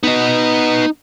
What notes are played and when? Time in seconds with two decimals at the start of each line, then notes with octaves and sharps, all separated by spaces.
0.03 B3 D#4 F#4 D#5